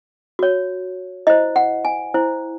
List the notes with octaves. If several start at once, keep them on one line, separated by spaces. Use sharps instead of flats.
F#4 C#5
E4 C5 D#5
F#5
G#5
E4 C5